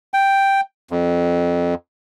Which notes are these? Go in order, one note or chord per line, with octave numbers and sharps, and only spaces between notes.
G5
F2